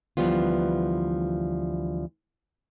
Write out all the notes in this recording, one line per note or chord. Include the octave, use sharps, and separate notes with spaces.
D2 E3 F3 G3 B3 F4